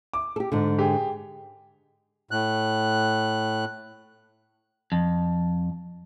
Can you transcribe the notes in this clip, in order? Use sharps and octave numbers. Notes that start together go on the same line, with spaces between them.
D6
G4 A4
G#2 D3
G4 G#4
A2 F#6
F2